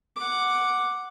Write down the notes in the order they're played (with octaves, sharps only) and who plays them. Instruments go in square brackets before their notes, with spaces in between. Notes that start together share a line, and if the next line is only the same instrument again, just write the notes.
[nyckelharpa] F#5 D6